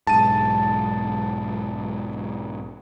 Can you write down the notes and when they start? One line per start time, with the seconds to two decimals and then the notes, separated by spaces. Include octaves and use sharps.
0.07 B1 G#2 A5 D#7